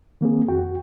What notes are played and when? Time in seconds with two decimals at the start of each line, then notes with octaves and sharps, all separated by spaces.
0.21 D#3 A#3 C4 G#4
0.48 F2 F#4 G5